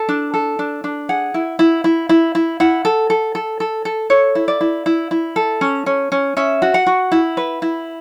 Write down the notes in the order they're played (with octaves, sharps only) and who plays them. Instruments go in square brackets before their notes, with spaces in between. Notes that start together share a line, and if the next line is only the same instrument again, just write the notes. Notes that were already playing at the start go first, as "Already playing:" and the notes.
Already playing: [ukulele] A4
D4
A4
D4
D4
G#4 F#5
E4
E4
E4
E4
E4
E4 F#5
A4
A4
A4
A4
A4
A4 C#5
E4
D5
E4
E4
E4
A4
C#4
C#4
C#4
C#4 E5
F#4
F#5
F#4
E4
B4
E4